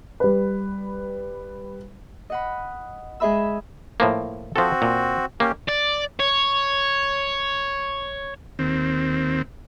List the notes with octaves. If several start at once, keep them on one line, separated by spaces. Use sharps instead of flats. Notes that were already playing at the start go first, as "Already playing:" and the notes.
G3 B4
D#5 F#5 B5
G#3 G#4 D#5 E5 B5 E6
A2 F3 A#3
F3 C4 F#4 A4
A#2
A#3 C#4 G4
D5
C#5
D#2 C4